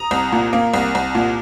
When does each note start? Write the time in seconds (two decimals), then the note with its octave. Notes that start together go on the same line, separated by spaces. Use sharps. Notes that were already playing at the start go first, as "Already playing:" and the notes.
Already playing: A#5 D#6
0.11 C2
0.32 A#2
0.53 A#3
0.74 C2
0.95 C2
1.15 A#2